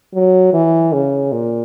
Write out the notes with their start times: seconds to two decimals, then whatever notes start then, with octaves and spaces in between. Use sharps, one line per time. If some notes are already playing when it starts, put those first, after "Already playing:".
0.14 F#3
0.53 E3
0.93 C#3
1.32 A#2